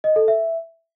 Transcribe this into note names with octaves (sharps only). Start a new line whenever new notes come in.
D#5
A4
E5